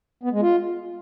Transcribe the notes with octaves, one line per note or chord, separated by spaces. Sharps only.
B3
G#3
F4